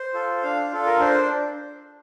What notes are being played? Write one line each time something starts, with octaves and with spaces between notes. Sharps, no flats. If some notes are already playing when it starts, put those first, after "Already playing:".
Already playing: C5
F4 A4
D4 F5
F4 A4
A#4
D4 C5